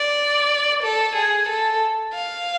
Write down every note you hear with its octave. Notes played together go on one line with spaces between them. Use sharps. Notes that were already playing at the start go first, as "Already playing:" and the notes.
Already playing: D5
A4
G#4
A4
F5